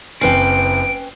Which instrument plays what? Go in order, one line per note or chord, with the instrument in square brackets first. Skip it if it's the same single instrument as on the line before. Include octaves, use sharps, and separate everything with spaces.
[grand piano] F#1 C4 C7 [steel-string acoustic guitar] C#4 B4 G5 [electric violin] D7